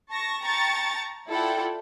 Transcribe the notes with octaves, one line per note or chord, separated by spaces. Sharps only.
A5 C#6 A#6
G5 A5 A#5 C#6 A6 C#7
E4 F4 A4 D5 F#5 G5